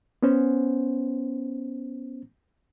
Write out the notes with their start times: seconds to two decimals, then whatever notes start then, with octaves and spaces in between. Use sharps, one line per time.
0.23 B3 C#4 C5